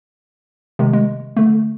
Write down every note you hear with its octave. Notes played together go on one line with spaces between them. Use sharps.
C3 D#3 G#3
G#3
D3 A3